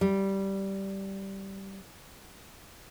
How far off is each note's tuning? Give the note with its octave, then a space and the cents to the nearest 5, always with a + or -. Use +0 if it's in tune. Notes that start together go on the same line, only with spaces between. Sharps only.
G3 -10